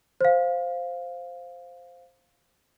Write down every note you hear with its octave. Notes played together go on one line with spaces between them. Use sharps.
C5 F5